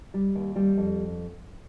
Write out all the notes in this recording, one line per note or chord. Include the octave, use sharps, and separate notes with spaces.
G3
D#2
G3
F2